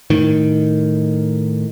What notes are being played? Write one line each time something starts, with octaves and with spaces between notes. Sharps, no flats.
A2 D#3